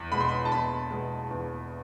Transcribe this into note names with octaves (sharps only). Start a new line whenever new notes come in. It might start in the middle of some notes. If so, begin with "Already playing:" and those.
Already playing: E2
B2 G#3 B5
C6
B5
A5
E2 B5
B2 G#3
E2